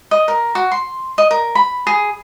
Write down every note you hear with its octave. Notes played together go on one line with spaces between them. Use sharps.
D#5
A#4
F#4
C6
D#5
A#4
B5
G#4